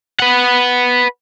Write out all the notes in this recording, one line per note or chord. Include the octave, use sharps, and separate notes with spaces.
B4 F#5